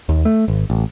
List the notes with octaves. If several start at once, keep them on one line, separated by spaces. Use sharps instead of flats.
D#2
A3
G#1
A1